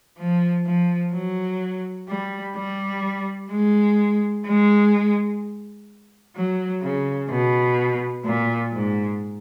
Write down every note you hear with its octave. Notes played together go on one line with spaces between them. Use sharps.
F3
F3
F#3
G3
G3
G#3
G#3
F#3
C#3
B2
A#2
G#2